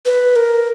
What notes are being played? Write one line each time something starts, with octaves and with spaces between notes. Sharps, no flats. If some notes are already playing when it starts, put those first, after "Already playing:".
B4
A#4